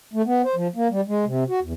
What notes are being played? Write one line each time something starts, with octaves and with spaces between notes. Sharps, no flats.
A3
B3
C5
F3
A#3
G3
G#3
C3
F#4
E2